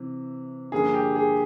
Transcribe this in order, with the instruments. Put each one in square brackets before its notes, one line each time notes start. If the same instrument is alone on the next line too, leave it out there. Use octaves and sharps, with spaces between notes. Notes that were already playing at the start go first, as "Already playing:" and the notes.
Already playing: [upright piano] C3 E3
[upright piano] G2 D3 F3 A#3 [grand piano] G#4
[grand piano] G4
G#4